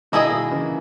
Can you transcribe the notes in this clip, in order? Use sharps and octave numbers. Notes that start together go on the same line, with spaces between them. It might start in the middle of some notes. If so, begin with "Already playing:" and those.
B2 D#3 A#3 E4 G#4 B4 D#5
B2 D#3
C#3 E3